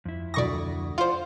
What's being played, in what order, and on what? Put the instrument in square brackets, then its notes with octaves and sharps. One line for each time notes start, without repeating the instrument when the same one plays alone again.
[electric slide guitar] F2 E4
[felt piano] D2 D#6 [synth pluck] D5 C#6 A#6
[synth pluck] F4 C5 [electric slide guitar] D5 F#5